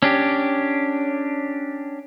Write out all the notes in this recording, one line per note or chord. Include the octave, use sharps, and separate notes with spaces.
C#4 D4 G4